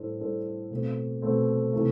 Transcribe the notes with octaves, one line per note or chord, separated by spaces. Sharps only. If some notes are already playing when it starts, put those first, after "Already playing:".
Already playing: A2 G3 D4 A4 C5
A2 G3 D4 A4 C5
B2 A3 C4
B2 A3 C4
C3 E3 A3